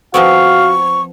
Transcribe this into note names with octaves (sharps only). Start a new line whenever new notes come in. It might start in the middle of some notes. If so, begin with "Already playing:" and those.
F3 B3 C4 F#4 F5 C#6